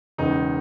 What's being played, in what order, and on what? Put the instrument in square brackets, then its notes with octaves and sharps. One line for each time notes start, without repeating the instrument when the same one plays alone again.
[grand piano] E1 E2 C#3 D#4